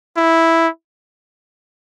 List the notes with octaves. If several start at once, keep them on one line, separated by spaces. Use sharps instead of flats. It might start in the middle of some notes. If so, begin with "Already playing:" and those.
E4